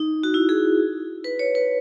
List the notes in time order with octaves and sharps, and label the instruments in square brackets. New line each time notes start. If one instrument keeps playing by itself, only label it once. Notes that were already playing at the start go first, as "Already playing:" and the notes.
Already playing: [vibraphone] D#4
F#4
E4
G#4
B4
C#5
B4